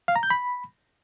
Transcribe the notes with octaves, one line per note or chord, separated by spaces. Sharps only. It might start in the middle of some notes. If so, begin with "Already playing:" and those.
F5
A#5
G6
B5